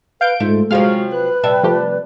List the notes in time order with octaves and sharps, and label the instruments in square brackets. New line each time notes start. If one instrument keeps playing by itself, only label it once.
[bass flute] B4 [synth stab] F5 G6 D7
[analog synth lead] G#2 [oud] A3 [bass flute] F4
[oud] C3 F3 F#3 [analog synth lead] G#3 [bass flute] F#4 [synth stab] F5 F6
[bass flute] B4 [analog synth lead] F#6
[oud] C3 G3 E5 [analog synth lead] A5
[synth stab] F3 A3 G4